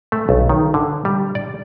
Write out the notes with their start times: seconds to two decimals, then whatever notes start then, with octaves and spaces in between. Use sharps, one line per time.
0.12 A3
0.29 B1
0.49 D#3
0.74 D3
1.05 G3
1.35 D5